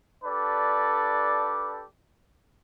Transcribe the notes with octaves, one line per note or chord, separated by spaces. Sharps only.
D4 G4 A4 B4 D5